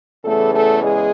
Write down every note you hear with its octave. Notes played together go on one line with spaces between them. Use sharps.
E2 C#3 E3 A3 A4
A3 A4
G#3 G#4